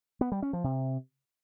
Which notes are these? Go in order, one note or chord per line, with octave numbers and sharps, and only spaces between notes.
B3
G3
C#4
F3
C3